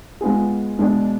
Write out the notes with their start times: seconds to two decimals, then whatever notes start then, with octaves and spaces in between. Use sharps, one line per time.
0.21 G#3 B3 F4 G#4
0.79 B2 G#3 D4 G#4